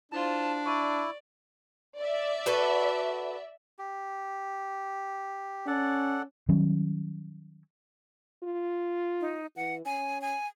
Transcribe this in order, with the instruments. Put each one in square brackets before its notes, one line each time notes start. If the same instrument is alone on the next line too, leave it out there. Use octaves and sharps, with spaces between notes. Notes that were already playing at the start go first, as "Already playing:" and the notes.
[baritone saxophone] D4 [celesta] E4 [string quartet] F4 C5 [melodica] A5
[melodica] E4 [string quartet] D5 [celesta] C#6 D6 D#7
[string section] D5 E5
[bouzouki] F#4 A4 B4
[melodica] G4
[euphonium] C#4 [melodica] A4 D5 F#5
[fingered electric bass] D#3 F#3 G3 C#4
[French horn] F4
[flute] D#4
[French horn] E3 [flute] F#5
[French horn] C#4 [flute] G#5
[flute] G#5